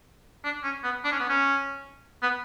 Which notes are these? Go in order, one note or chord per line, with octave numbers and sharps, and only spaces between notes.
D4
C#4
B3
D4
C#4
B3
C#4
B3